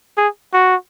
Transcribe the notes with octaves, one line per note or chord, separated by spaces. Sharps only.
G#4
F#4